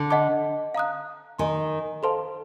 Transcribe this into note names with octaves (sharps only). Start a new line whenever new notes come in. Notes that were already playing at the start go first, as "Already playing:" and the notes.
Already playing: D3
D#5 F#5 A5 D6
F5 A#5 D#6 F#6
D#3 D#5 G#5 C6
A4 C5 F5 A5 C6